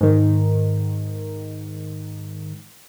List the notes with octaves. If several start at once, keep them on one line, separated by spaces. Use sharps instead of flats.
G#2 D#3